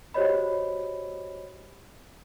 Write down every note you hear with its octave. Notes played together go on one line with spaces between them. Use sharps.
F#4 G4 C5 C#5 D#5 B5